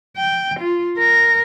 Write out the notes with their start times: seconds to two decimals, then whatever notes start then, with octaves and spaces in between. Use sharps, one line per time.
0.17 G5
0.60 F4
0.98 A#4